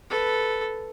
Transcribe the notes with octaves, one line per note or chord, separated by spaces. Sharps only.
A4 B4